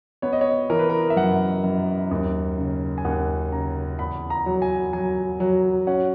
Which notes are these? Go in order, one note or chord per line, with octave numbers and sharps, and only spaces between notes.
B3 C#5
D#5
C#5
E3 A#4
B4
A#4
E5
F#2 F#5
F#2
D#2
C#3
G#5
D#2 F#5
C#3 A#5
E2 B5
A#5
F#3
G#5
F#3 G#5
F#3
C#4 F#5